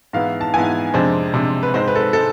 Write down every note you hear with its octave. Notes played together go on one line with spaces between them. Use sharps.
G#2 E3 B3 E4 F5
A5
G#2 E3 B3 E4 G#5
F2 C3 G#3 D4 C5
F2 C3 G#3 D4
B4
G#2 G#3 C4 C5
B4
A4
B4
G#3 A4